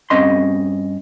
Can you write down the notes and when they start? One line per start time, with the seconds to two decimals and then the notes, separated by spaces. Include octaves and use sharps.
0.10 G2 E3 C4 C#4 D#5 C6